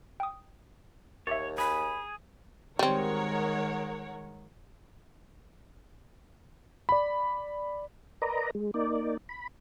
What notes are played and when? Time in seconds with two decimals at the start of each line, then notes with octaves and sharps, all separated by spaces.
0.20 G5 D#6
1.27 D#2 C#5 E5 D6 A6
1.58 G#4 B5
2.79 D#3 G3 G#3 C4 A#4 C#5 F#5
6.89 D5 B5
8.22 A#4 B4 D5 D#5 A#5
8.55 G#3
8.74 A#3 D#4 D5
9.29 B5